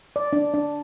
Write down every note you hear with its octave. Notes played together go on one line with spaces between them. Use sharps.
D5
D4
D4